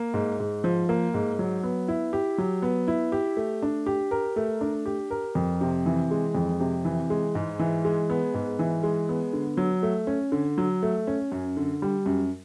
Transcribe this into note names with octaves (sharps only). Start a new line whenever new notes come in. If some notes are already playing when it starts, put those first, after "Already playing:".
Already playing: A#3
G#2
G#2
F3
A#3
G#2
F#3
B3
E4
G4
F#3
B3
E4
G4
A3
D4
G4
A#4
A3
D4
G4
A#4
F2
C3
E3
G#3
F2
C3
E3
G#3
G#2
E3
G#3
B3
G#2
E3
G#3
B3
D3
F#3
A3
C#4
D3
F#3
A3
C#4
F#2
D3
G3
F#2